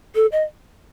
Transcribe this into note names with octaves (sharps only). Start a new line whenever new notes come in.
A4
D#5